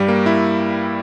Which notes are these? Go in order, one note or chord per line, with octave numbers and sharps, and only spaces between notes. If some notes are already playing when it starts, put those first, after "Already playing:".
Already playing: G2 G3
A#3
E4